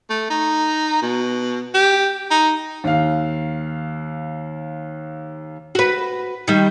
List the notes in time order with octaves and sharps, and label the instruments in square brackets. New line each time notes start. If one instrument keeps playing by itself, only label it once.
[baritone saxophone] A3
D#4
B2
G4
D#4
[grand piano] D#2 F5
[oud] F#4 B4
D#3 G3